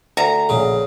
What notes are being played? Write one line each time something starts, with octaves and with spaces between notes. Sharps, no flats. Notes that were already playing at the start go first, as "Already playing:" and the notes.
D2 A#5
A#1 C#3 G#3